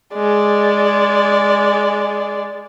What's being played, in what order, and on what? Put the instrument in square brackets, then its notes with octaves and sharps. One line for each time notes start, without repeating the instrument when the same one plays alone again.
[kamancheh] G#3 D5